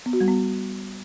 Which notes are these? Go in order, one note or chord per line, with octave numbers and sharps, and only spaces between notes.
B3
F#4
G3
B3